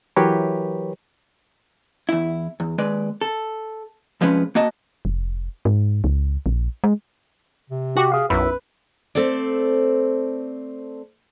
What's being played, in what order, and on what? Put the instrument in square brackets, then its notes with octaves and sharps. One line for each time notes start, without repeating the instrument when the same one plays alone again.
[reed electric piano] E3 F#3 G4 A#4 B4 C#5
[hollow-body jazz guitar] E2 E4
E2
D#2 G#3 B4 D5
A4
C2 F3 G#3 C#4 B4
A#3 F#4 D#5 A5
[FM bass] F1
G#2
C#2
A#1
G#3
[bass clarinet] C3
[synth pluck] F#4 [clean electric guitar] G4
[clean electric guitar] G#4 F5
[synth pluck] B1 F#2 [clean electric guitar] E4 [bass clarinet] B4
[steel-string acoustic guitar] A3 C4 A4 C5 D5